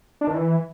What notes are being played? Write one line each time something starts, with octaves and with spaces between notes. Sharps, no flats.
D4
D#3
E3